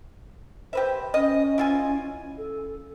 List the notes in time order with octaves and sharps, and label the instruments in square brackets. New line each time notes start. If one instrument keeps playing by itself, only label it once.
[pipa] G4 B4 E5 [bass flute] C5
[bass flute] C#4 [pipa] D#5
[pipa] E4 F4 G#5
[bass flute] A4